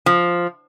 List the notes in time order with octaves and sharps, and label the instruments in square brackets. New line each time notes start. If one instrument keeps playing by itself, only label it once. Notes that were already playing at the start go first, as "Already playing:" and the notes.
[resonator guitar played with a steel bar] F3